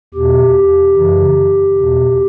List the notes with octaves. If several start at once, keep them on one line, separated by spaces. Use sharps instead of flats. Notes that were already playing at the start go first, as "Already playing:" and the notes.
E2 B2 G4
F#2 C#3 E3
E2 B2